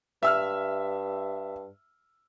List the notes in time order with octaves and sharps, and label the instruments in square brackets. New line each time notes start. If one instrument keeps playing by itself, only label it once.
[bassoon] G2 [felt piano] E5 E6 F6